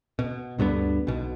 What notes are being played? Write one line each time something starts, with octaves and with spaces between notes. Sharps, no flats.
B2
D2 G2 D3 B3
B1 B2